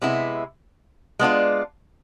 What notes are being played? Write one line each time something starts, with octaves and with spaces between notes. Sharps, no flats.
C3 G#3 B3 E4
G#3 B3 D4 F4